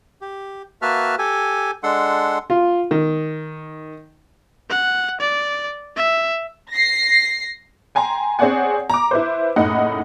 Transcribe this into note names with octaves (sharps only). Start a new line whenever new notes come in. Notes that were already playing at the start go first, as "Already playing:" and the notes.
G4
A#3 F#4 B4 E5 A5 F6
G4 A4 G#5
G#3 D4 A4 F#5 C6
F4
D#3
F#5
D5
E5
A#6 C7
G5 G#5 A#5 C6
C4 G#4 C#5 D5 F#5 G#5
A#5 D6
E4 B4 C5
F#1 A2 D#4 F#5